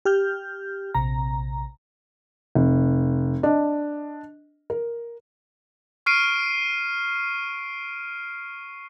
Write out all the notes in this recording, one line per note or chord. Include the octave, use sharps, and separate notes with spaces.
G4 F6 G6
A#1 C3 A#5
F1
D4 D#5
A#4
C#6 F6 C7 D7 D#7